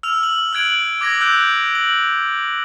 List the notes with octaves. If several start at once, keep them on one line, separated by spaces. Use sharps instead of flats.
E6 F6 F7
F#7
E6 F#6 G#6 D7 F#7
D6 G#6 A#6 D7
E6 F#6 G6
F#7